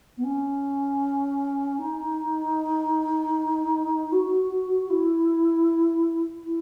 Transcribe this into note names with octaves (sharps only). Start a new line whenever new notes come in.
B3
C#4
D#4
F#4
E4
E4